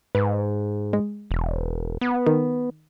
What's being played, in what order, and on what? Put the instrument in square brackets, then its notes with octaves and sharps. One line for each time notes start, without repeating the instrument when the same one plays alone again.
[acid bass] G#2 [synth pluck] B4
[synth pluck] G#3
[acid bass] E1
B3
[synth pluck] D#3